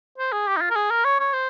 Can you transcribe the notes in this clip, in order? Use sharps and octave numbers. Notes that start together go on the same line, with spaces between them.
C5
G#4
G4
D#4
F4
A#4
G#4
A#4
C#5
C#5
C5